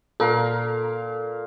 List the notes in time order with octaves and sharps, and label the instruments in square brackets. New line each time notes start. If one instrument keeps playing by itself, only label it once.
[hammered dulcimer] A#2 A#4 F5 [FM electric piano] A4